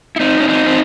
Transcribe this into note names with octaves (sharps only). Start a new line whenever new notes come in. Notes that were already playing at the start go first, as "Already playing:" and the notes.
E4
C4 D#4
C#4
C4 D#4
C4